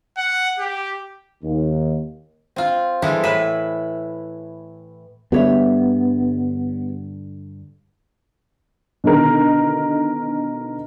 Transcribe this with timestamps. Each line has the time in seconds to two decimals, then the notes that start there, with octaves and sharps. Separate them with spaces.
0.18 F#5
0.59 G4
1.43 D#2
2.56 C4 F4
3.02 E3 G3 G#3 A4
3.24 A2 B4 E5
5.32 G2 D3 B3 G4 C#5 E5
9.04 B2 D3 D#3 A#4